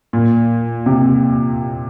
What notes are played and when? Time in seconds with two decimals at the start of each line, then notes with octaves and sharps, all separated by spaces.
0.13 A#2
0.86 C3